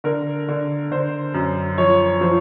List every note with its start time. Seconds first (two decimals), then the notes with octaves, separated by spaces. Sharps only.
0.04 D3 A#4
0.49 D3
0.91 D3 C5
1.34 F#2
1.78 F3 C#5
2.21 F3 C5